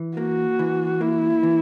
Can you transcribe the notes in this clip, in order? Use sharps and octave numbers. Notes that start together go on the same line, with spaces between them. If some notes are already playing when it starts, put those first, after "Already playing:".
Already playing: E3
A#3 F#4
E3
A#3 E4
E3